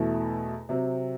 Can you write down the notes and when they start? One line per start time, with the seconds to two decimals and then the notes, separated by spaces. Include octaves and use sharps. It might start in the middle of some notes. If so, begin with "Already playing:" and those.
Already playing: E2 B2 A3 E4
0.69 C3 F#3 C4